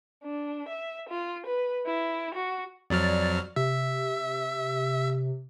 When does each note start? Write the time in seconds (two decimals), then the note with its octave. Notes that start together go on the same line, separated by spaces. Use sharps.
0.24 D4
0.69 E5
1.09 F4
1.45 B4
1.87 E4
2.34 F#4
2.90 F2 F#3 D5 F6
3.56 C3 E5